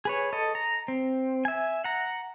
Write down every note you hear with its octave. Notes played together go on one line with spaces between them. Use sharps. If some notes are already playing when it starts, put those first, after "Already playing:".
G#4 B4 C#5
A4 D#5
A#5
C4
E5 G#5
F#5 A#5